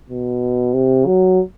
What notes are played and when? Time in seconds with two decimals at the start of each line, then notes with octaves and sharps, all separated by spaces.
0.09 B2
0.74 C3
1.06 F#3